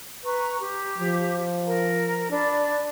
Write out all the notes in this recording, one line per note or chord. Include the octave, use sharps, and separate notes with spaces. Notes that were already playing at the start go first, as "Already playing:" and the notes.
B4 A#5 C#6
G4
F3
A#4 A#5
D4 D5 B5